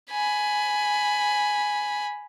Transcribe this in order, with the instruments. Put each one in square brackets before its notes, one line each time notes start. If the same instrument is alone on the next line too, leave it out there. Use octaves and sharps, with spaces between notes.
[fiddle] G#5 B5